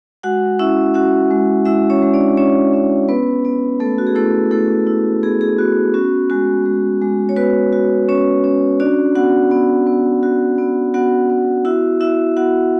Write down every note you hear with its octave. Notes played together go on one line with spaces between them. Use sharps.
G#3 F#4 F#5
C#4 E4 E5
C#4 F#4 F#5
G#3
G#3 E4 E5
C#4 C#5
G#3
D4 D5
C#4 C#5
C#4
B3 B4
B3
A3 B3 A4
F#4
G#4
A3 E4 A4
A3 E4 A4
E4
B3 G#4
G#4
B3 F#4
C#4 F#4
G#3 F#4
G#3
G#3
C#5
B3 F#4 B4
F#4
C#4 C#5
C#4
D4 F#4 D5
B3 F#4 F#5
B3
B3
F#4
B3
B3 F#4 F#5
B3
E4 F#4 E5
E4 F#4 E5
B3 F#4 F#5